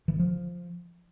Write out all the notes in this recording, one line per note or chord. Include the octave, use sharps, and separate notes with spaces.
E3
D#3
F3